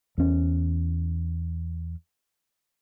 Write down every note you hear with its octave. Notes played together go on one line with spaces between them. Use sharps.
E2 C#4